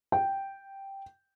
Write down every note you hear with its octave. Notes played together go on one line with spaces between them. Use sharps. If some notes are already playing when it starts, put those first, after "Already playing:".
G5